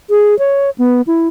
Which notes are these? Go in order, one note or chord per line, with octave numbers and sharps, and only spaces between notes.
G#4
C#5
B3
E4